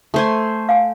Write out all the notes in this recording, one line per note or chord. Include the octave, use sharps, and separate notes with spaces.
A3 C5 G#5
F5 G#5